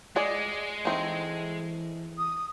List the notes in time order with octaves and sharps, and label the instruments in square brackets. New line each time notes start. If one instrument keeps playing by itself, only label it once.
[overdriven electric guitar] G#3 [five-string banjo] G#4 D5
[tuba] E3 [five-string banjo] A3 C4 D#4
[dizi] D#6